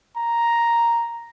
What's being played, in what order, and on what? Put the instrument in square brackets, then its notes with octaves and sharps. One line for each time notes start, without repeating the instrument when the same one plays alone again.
[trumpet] A#5